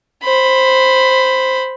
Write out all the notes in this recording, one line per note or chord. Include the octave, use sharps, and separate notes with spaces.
C5 B5